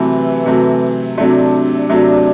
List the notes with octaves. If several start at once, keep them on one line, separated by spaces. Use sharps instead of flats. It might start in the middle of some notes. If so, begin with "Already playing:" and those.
Already playing: C3 E3 F#3 A3
C3 F#3 A3
C3 F#3 A3 D4
C3 F#3 A3